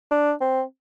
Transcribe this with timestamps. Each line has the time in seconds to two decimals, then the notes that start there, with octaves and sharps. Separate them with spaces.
0.11 D4
0.41 C4